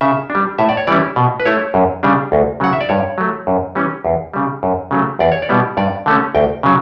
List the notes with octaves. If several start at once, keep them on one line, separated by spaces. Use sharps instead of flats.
C#3 E5
D4
G3
A2 E5
D5
C#5
E3 G3 C#4 E4 D5
B2
B4
A3 E4 C#5
F#2
C#3 G3 D4
D2
C#3 F#3 F#5
E5
D5
G2 C#5
F#3 A3
F#2
E3 G3 C#4
E2
C#3 G3
F#2
C#3 F#3 A3
E2 D5
C#5
D5
B2 G3 B3 E4
G2 D5
D3 A3 C#4
D2 G5
C#3 F#3